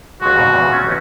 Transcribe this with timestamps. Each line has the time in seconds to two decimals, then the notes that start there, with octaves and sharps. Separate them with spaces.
0.21 C#2 G#3 F#4
0.36 F2 G#2 B2
0.53 E2 A#2 C#3
0.71 C4 C#4 F4
0.87 A1 A3 C#4